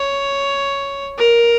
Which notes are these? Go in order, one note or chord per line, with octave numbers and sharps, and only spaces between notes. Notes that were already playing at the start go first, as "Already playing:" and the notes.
Already playing: C#5
A#4